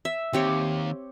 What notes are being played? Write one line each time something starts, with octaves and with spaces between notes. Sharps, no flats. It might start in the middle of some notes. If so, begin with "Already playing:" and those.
E5
D#2 C4 G4 C#5